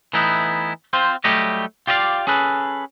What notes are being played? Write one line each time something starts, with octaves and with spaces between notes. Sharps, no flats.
E3 A3 B3 D#4 E4
C4 F4 C5
F#3 G3 A3 G4 C#5 D#5
F4 G4 D5 D#5 F5
C#4 G#4 A4 B4